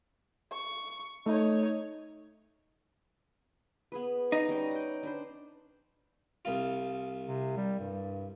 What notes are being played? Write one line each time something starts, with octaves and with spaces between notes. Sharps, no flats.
C#6
A3 D#4 C#5
B3 G#4 B4
D#4
G3 C#4 G5
F#5 G5
D4 B4 C5
C2 F4
C3
G3
G2